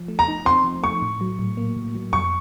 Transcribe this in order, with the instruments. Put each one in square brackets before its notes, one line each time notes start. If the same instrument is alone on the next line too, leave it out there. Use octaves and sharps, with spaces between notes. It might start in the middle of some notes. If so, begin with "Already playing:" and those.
Already playing: [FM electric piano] F3
A3
[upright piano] A#5
[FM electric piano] D#4
[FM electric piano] C4 [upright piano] C6
[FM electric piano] F3
[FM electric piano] A3 [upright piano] C#6
[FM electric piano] A2
F#3
A2
A#3
A2
F#3
[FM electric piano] F2 [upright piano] C#6